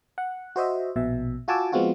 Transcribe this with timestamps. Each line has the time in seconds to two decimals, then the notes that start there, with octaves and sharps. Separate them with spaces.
0.18 F#5
0.56 F#4 C5 D#5 E5
0.96 A#1 B2 E5
1.48 F4 F#4 G#5 A5 D6 E6
1.72 F3 G#3 B3 C4 F4 F#4